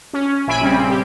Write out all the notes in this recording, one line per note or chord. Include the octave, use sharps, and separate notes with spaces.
C#4
A#1 E5 G#5 B5 D7
C#3 G3 C4
G4